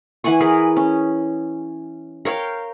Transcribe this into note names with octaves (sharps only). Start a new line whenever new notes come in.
E3 F#5 G#5 C#6
G#4 A#4 B4
C#4
A#4 C#5 F5 G5